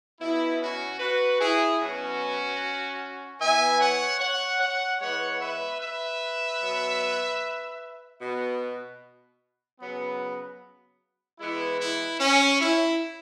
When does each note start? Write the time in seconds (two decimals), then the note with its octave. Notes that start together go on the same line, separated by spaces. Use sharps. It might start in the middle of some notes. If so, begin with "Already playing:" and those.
0.20 B2 B3 E4
0.60 C#4 F#4
1.00 F#4 B4
1.40 E4 G#4
1.80 B2 F#3 B3 C#4 F#4
3.40 E3 B3 E5 G#5
3.80 C#5 F#5
4.20 C#5 F#5
4.60 C#5 F#5
5.00 E3 G#3 B3 C#5 F#5
5.40 B4 E5
5.80 B4 E5
6.60 B2 F#3 B3
8.20 B2 B3
9.80 C#3 F#3 B3
11.39 E3 G#3 B3 E4
11.79 E4
12.20 C#4
12.60 E4